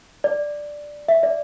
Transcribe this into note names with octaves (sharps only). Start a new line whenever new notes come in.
D5
E5
D5